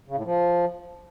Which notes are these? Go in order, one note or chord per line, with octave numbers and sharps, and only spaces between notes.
C#3
A2
F3